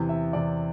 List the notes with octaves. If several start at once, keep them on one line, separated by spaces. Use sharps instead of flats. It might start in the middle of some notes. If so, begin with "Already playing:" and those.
Already playing: E2 C3 E3
E5
E2 C3 E3 D5